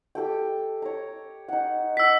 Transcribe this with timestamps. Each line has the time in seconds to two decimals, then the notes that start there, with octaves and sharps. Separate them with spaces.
0.15 G4 A4 G5
0.82 C#5 A#5
1.48 D#4 F#5
1.97 F#5 E6 B6